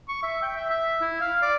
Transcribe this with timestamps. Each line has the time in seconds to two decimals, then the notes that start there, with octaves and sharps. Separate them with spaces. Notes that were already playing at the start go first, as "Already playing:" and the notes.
0.09 C#6
0.23 E5
0.42 G5
0.56 E5
0.70 E5
1.01 E4
1.21 F5
1.42 D5